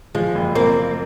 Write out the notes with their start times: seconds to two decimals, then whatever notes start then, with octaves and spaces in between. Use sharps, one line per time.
0.15 F3 G#3
0.35 F#1
0.55 A#3 C4